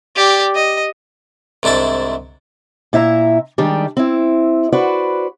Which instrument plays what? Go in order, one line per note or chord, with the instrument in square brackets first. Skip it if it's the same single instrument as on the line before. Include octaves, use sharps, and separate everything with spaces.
[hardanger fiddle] G4 D5
D#5
[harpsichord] C2 G#2 D4 E4 A5
[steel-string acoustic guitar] A#2 E4 E5 A#5
D#3 G3 G#3 D4 G4
C4 E4
F#4 B4 C5 D5